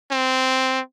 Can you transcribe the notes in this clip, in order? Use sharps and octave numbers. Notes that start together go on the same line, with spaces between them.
C4